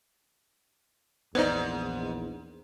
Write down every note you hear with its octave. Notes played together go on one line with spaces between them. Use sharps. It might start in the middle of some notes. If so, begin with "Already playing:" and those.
A#1 E2 G#2 B3 D#4 C5 D5